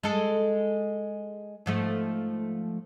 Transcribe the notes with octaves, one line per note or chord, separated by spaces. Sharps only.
G#3 A4
G#2 F3 A3